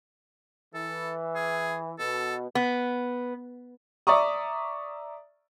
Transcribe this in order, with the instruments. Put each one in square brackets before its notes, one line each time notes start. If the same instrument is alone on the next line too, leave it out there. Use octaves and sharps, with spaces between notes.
[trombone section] E3 [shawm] A4
[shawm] G#4
[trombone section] B2 [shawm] A4
[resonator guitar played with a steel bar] B3
[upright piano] D5 E5 A#5 C#6 D#6